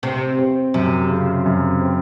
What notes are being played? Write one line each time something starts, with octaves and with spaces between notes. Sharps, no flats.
C3 C4
C4
F#2 C3
C#3
F#2
C4